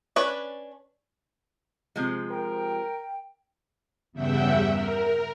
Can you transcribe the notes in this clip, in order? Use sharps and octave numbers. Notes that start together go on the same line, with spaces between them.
C#4 D4 B4 C#5
C3 F3 G#3
A#4 G5
E2 G2 C#3 E5 F#5 G5
A#4